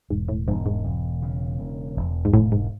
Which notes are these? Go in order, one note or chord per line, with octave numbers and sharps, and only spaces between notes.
E1 G#2
A2
E1 G#2
G#2
E1
C#3
E1
E1
G#2
E1 A2
G#2